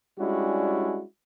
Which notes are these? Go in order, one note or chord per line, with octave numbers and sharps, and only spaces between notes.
G3 G#3 C#4 D4 E4 F#4